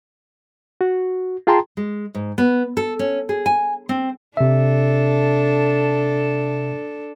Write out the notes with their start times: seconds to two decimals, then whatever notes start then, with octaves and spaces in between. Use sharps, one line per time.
0.81 F#4
1.47 F4 G#4 G5 A5 A#5 C6
1.77 G#3
2.15 G#2
2.38 B3
2.77 A4
2.99 C#4
3.29 G#4
3.46 G#5
3.89 C4
4.37 C3 D4 A4 E5